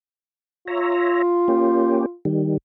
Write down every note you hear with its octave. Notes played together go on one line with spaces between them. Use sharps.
F4 C#5 E5 A#5
A#3 C#4 G4
D#3 G3